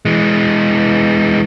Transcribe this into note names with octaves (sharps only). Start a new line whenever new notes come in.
E3 G#3